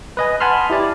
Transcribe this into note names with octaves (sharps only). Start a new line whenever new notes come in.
B4 D#5 G#5
F#5 G#5 A5 B5 C6 F6
E4 G4 D5